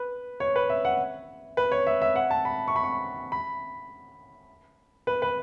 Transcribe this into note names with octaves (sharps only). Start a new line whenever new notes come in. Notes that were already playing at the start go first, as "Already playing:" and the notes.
Already playing: B4
C#5
B4
E5
F#5
B4
C#5
E5
E5
F#5
A5
B5
C#6
B5
C#6
B5
B4
B4